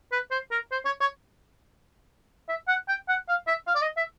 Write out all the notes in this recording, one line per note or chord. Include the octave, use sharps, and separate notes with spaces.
B4
C5
A#4
C5
C#5
C#5
E5
F#5
G5
F#5
F5
E5
F5
D5
D#5
E5